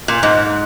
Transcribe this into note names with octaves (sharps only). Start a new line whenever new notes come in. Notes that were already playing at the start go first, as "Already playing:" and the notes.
A#2
G#2